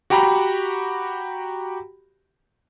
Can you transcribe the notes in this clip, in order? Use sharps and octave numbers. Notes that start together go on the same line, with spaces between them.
F#4 G4 G5 A#5 B5